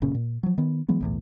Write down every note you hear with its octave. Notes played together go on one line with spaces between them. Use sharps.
F#1 A#2 C#3 C#4
A#2
F3 F#3
D#3 B3
E3 F#3 G#3 B3
B1 E2 A2